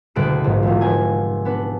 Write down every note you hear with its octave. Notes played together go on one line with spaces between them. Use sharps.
F#1 D2 B2 F#6 D7
A#1 G#2
E1 E2
F1 G#5
B3 D4 B4